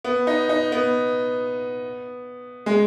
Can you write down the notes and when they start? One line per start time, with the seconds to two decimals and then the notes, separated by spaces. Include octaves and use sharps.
0.04 B3
0.27 D#4
0.49 D#4
0.72 B3
2.66 G#3